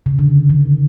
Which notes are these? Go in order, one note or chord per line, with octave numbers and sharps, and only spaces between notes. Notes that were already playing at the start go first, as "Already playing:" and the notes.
C#3
D3
D#3